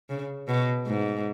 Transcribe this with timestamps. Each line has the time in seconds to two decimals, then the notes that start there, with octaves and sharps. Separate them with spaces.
0.10 C#3
0.48 B2
0.86 G#2